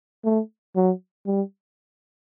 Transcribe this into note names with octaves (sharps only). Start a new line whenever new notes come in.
A3
F#3
G3